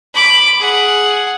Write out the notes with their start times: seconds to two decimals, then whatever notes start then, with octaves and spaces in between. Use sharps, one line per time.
0.14 B5 D6
0.59 G#4 F#5